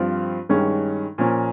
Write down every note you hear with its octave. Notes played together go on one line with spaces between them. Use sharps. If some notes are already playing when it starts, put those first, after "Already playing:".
Already playing: G2 F3 C4 F4
G2 D#3 G#3 C#4
A#2 F3 A#3 C#4